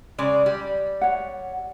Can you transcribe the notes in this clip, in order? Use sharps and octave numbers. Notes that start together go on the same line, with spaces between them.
C#3 G#3 D5
G3
C#5 F#5